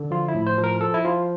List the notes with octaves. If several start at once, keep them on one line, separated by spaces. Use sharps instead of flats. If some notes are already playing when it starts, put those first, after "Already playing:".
Already playing: D3
F3 F4
E4
A2
C5
F3
A#4
F3 A4
E4
F3 F4